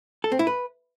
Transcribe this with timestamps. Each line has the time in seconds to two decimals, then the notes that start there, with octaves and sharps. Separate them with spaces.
0.24 A4
0.32 C4
0.39 E4
0.47 B4